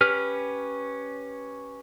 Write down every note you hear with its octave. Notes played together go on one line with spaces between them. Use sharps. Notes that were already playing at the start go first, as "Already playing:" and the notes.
C#4 G4 B4 F6